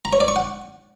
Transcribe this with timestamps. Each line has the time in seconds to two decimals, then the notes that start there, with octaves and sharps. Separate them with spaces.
0.05 A#5
0.13 C#5
0.20 D5
0.28 C#6
0.36 F#5